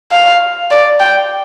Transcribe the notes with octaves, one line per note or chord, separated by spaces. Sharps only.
F5
D5
G5